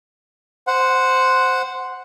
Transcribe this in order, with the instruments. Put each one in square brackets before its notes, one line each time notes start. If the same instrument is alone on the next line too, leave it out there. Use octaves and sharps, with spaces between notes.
[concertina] C5 F#5